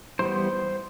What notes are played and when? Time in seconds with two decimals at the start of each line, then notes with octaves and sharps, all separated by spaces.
0.19 E3 G3 B3 C5